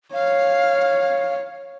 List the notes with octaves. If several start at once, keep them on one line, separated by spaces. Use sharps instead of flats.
C#5 F5